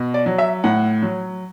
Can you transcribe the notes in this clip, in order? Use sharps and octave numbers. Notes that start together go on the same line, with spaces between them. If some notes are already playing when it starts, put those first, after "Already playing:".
Already playing: B2
D5
F#3
E5
A2 F#5
F#3